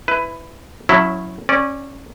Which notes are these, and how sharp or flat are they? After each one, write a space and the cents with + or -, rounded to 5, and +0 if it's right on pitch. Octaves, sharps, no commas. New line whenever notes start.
E4 +0 B4 +15
F#3 -20 C#4 +0 E4 +0
C#4 -15 D5 +0